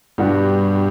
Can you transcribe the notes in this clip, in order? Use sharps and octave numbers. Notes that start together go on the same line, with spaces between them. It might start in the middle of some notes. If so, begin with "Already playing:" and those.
G2 B2 G3 B3 D4 F#4